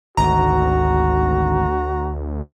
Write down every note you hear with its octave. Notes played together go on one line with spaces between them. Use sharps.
G#1 D2 F#4 A#5